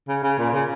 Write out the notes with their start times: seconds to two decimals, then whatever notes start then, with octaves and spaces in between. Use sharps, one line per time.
0.08 C#3
0.23 C#3
0.39 A#2
0.53 C#3